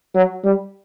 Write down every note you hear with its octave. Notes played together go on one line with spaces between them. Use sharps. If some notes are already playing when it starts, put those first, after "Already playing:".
F#3
G3